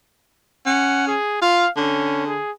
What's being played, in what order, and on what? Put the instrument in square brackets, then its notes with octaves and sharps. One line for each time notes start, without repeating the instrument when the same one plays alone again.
[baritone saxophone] C#4 [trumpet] F#5
[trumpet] G#4
[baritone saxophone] F4 [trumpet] F5
[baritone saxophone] D3 [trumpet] C#4
[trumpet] G#4